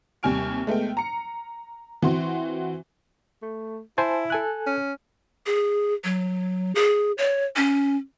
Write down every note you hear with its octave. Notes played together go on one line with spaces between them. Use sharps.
D#2 C3 G3 G#5 F6 D7
G#3 A3 B3 G5
A#5 C#7
E3 C4 F#4 C6
A3
E4 C5 G#5 A5
A4 G#5 F#6
C#4
G#4
F#3
G#4
C#5
C#4